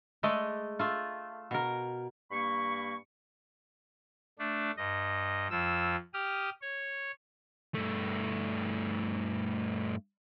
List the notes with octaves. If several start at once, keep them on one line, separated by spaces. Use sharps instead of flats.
G#3 A3 D5 D#5
A3 F4
B2 A#4
G2 A#3 B5 C#6
A3 D4
G2 D#5
F2 F3 E6
G4 D#6 F6
C#5
G2 A3